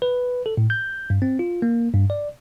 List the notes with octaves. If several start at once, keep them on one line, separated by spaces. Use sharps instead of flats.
B4
A4
A2
G6
G2
C4
F4
A#3
G2
D5